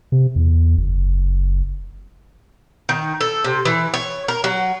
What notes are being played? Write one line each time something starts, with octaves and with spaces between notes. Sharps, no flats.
C3
E2
F#1
D#3
A4
C3
E3
C#5
A#4
F#3